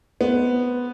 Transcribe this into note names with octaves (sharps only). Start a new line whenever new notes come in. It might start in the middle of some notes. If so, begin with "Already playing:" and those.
B3 C4